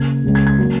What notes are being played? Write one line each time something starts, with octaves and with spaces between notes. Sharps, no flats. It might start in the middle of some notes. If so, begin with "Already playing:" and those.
Already playing: C#3 A#3 G#6
C#2 C#3 G#3
G#6
G#6
F#3 A#3 C#4